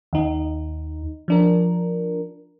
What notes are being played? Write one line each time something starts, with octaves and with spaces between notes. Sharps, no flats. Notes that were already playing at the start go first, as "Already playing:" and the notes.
D#2 D#4
F3 D4 A#4